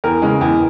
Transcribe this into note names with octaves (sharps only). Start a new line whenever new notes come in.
E2 A#4
C#3 G#3
E2